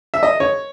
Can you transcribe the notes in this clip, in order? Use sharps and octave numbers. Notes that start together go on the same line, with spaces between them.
E5
D#5
C#5